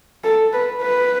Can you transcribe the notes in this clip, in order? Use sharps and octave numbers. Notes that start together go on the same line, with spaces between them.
A4
B4
B4